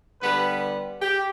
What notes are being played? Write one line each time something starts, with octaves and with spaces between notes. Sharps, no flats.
D3 G3 B3 B4
G4